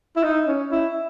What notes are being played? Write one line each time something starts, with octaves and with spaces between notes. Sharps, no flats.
E4
D#4
C#4
E4